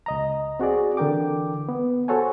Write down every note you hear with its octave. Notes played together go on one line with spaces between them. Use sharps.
C#2 D#5 A#5
C4 F#4 G#4 D5
D3 E3 A#4 G5 D6
B3
F#4 A4 C5 C#5 F#5 G#5